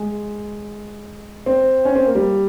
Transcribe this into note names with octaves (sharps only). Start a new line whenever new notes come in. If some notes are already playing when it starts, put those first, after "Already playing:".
Already playing: G#3
C4
C#4
C4
A#3
G3